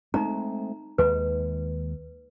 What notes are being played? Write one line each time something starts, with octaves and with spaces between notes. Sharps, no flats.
G#3 A3 C4 D#4 A#5
D#2 G#3 B4